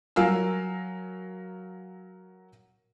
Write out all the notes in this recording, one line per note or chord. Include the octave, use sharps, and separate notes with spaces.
F#3 A#4 F5 G#5 E6